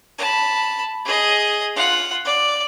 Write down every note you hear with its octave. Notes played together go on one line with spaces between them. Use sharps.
A5 B5
G#4 D#5
F4 F#5
D5